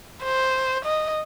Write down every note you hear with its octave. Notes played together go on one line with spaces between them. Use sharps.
C5
D#5